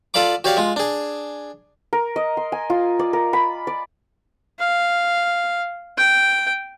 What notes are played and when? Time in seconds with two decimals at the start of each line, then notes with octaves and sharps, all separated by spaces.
0.14 F4 A4 D5 F5 B5 D6
0.44 F#4 G4 C#5 D5 F5
0.57 G#3 F4
0.76 D4 G#4
1.93 A#4
2.16 D#5
2.37 C6
2.52 G#5
2.70 F4
2.99 D5
3.13 A#4
3.33 B5
3.67 D5
4.60 F5
5.98 G5